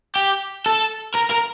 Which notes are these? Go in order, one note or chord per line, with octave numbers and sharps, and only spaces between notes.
G4
A4
A#4
A#4